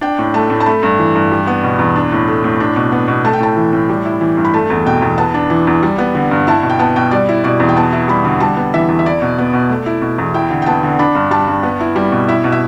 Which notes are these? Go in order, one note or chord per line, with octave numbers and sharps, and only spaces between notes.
D4 G5
A2
A3 A5
A2
A5
A3 B5
G2
E3
G2
G3
B3
B2
E2
D4
A2
A3
A2
D4
B2
B3
B2
A3 A5
G5
A2 A5
E3
A2
G3
E4
E3
G2
B5
A3 A5
E2
B2 G5
E2
B3 A5
D4
E3
E2
G3
B3
D3
G2
E4 A5
B2
G5
B3 A5
B2 G5
G3 D5
E4
B2 D5
E2
G5
B3 A5
E4
G3 B5
D3
G3 A5
B3
E3 E5
E2
E5
E4 D5
B2
B3
B2
A3
E4
B2
E2
E4 G5
D3
G5
B3 A5
D3
D4 B5
G2
G3 A5
G2
B3
E4
G3
B2
E4 E5
B2
E5